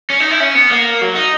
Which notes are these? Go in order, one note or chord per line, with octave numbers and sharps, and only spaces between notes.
C#4
D#4
E4
C#4
B3
A#3
F#3
D#4